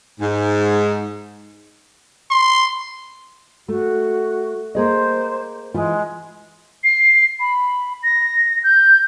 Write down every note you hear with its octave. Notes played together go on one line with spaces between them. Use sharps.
G#2
C6
A3 F#4
A#3 G#4 C5 D#5
E3 G#3 F4
C7
B5
A#6
G6